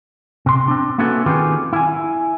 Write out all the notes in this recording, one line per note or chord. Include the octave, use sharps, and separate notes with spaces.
C3 C6
C4 D4
A#3 B3 C#4 E4 F#4 A4
D#3 C4 F4 G4 G#4 B4
E4 G#5